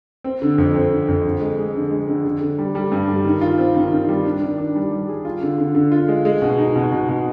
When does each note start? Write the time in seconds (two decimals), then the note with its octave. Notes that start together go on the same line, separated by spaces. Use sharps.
0.24 C4
0.42 D3
0.58 F2
0.74 C4
0.91 D3
1.08 F2
1.25 D3
1.41 G#3
1.58 G#3
1.75 D3
1.91 G#3
2.08 D3
2.25 D3
2.42 D3
2.58 G3
2.75 G3
2.92 G2
3.08 G3
3.24 D#3
3.41 F4
3.58 C4
3.75 D#3
3.92 D#3
4.08 G3
4.25 D4
4.41 D#3
4.58 D4
4.76 G3
4.92 G3
5.08 G#4
5.25 F4
5.41 D3
5.58 D3
5.75 D3
5.92 F4
6.08 G#3
6.25 G#3
6.42 B2
6.58 D#4
6.76 B2
6.92 B2
7.09 B2